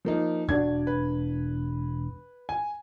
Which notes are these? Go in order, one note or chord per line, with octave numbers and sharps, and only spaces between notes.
F3 A#3 D#4
E1 D4 F#4 D5 G#6
B4
G#5